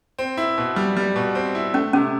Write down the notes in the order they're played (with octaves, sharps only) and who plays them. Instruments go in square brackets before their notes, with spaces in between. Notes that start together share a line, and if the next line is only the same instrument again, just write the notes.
[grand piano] C4
E4
B2
G3
G3
B2
C4
E4
[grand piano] A3 [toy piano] C#4
[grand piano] C3 [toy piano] C#4